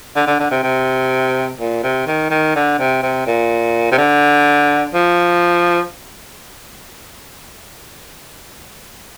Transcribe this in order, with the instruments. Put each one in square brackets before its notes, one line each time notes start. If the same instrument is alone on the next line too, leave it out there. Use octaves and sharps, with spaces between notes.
[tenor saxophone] D3
D3
D3
C3
C3
A#2
C3
D#3
D#3
D3
C3
C3
A#2
C3
D3
F3